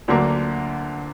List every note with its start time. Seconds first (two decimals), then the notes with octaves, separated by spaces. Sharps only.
0.08 D2 D3 F#3 A#3 D4